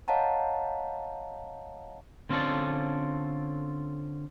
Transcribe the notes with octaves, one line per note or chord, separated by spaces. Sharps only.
C#5 D#5 F5 F#5 A5 A#5
D3 C4 C#4 F4 A4 D5